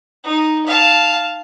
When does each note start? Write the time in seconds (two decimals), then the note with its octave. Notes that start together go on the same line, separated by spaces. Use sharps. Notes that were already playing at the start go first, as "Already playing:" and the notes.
0.24 D#4
0.66 F5 A5